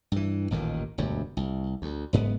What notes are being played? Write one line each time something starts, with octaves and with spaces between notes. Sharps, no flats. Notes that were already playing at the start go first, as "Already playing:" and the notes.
G2 E3
A1 D#2 A#2 D#3
E1 D2 G2
C2
D2
F#1 G#2 B3